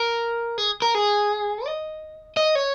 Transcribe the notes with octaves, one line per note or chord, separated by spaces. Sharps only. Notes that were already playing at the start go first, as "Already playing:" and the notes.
Already playing: A#4
G#4
A#4
G#4
D#5
D#5
C#5